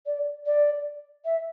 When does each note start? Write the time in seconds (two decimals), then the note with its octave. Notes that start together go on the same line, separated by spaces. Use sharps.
0.06 D5
0.46 D5
1.25 E5